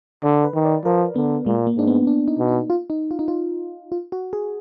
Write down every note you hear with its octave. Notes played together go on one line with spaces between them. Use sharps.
D3 D5
B4
D#3
D5
F3 A#4
D3 B3
A#2 G#3
A#3
G#2 D4
B3
D4
D#4
B2
D#4
F4
D#4
F4
D#4
F4
F4
F#4
G#4